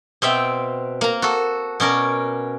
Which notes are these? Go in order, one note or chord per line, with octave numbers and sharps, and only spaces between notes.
B2 C4 E5 G5
A#3 A#5
F#4 A4
B2 C#4 A#4 D5